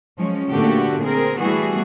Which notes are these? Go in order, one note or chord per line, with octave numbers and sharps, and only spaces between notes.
F3 F#3 G#3 C#4
A#2 D3 A3 B3 F#4 G4
C4 G#4 A#4
E3 G3 A3 B3 F#4 G#4